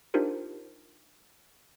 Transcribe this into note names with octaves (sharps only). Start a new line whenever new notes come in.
D4 D#4 F4 G4 A#4 C5